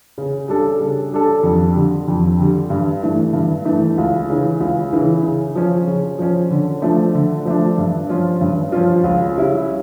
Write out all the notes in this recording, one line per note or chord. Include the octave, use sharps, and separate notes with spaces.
C#3
G3 D4 A4
C#3
G3 D4 A4
F2
D3 G3
F2
D3 G3
G2
E3 A3
G2
E3 A3
C#2
C#3 E3
C#2
C#3 E3
C#3
F3 C#4
C#3
F3 C#4
D3
F3 A3 D4
D3
F3 A3 D4
G2
F3 C#4 F4
G2
F3 C#4 F4
C#2
C#3 G3 C#4 E4